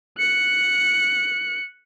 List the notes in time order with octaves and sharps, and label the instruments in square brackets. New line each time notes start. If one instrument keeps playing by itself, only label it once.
[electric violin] F#6 C#7